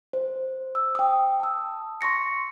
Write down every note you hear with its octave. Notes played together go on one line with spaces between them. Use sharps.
C5
E6
G5 D#6
A5 E6
C6 C#6 A#6 C#7